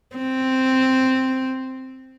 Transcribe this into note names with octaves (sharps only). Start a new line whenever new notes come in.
C4